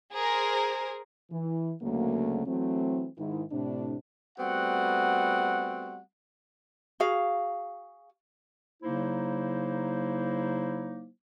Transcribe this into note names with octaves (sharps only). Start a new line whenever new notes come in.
G#4 A#4 C5
E3
D2 C#3 F#3 A3 A#3
E3 F#3 A3 C4
G#2 D#3 E4
A2 C3 D4
G3 A3 B3 C4 F#4 F#5
F#4 G#4 F5
C#3 F#3 A#3 D#4 E4 C5